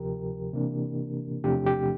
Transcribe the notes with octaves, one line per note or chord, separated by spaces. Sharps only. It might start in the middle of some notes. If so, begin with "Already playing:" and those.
Already playing: D2 C3 F3 G4 A#4
C3 E3 A#3 D4
E2 C3 F3 A3 D4 G4
G4